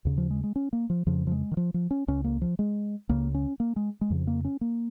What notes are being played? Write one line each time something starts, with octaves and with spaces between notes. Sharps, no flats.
D#2 C#3
F3
G#3
G#3
C#4
A#3
F3
F2 C#3 F3
F3
G#3
D#3
F3
F3
C#4
C#2 C#3 C#4
A#3
F3
G#3
C#2 C#3 A#3
C#4
A#3
G#3
G#3
F2 C#3 F3
A#3
C#4
A#3